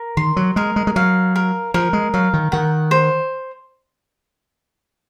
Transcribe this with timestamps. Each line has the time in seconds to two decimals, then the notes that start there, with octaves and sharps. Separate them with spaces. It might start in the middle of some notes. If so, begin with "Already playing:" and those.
Already playing: A#4
0.17 D#3 C6
0.36 F#3
0.56 G#3 A#4
0.76 G#3
0.87 G#3
0.96 F#3 F5
1.36 A#4
1.74 F3 A#4
1.93 G#3
2.14 F#3 F5
2.33 D#3
2.52 D#3 F#5
2.91 C5